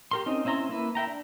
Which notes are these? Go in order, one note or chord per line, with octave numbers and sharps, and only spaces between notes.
G4 A#4 C6
C4 C#4 D#4
C4 C#4 E4 A#5 C6
A#3 E4 B4
E5 G5 A#5
D4